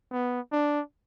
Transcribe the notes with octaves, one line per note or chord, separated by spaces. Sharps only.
B3
D4